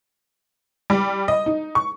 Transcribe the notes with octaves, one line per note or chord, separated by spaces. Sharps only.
G3
D#5
D#4
C#6